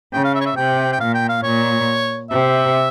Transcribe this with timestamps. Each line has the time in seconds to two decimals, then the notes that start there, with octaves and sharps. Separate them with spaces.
0.12 C#3 G5
0.24 F5
0.35 E5
0.41 C#5
0.46 E5
0.57 C3 G5
0.92 G5
1.00 A#2 F5
1.14 G5
1.29 F5
1.43 A#2 C#5
2.30 C3 E5